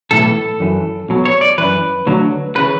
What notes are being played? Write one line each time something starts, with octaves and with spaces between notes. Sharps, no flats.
B1 A2 E3 A4
F#2 E3
B1 B2 F#3
C#5
D5
F#2 E3 B4
D2 D3 F#3
C#3 E3 B4